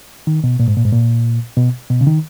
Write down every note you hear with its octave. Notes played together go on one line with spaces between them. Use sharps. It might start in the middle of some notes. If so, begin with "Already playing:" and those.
D#3
B2
A#2
G#2
A#2
G#2
A#2
B2
B2
C#3
D#3